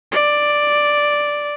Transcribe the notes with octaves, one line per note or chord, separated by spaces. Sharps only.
D5